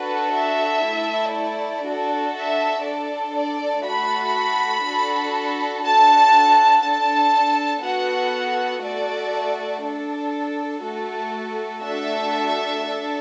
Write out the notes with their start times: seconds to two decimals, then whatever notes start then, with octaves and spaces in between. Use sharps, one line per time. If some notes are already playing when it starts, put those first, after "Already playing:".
Already playing: D4 F#4 A4 B4
0.35 E5
0.85 A3 E4 A4
1.35 D5
1.85 D4 F#4 A4
2.35 E5
2.85 D4 A4 D5
3.35 D5
3.85 A3 F#4 A4 B5
4.85 D4 F#4 A4
5.84 D4 F#4 A4 A5
6.84 D4 A4 A5
7.84 B3 F#4 A4 F#5
8.83 A3 F#4 A4 D5
9.84 D4 A4
10.83 A3 F#4 A4
11.83 A3 D4 F#4 A4 E5
12.82 D4
12.87 A4